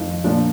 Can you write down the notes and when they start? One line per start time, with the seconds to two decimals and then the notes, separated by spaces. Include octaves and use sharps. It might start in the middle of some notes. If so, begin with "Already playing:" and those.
Already playing: F2 D#3
0.24 A#2 F3 D4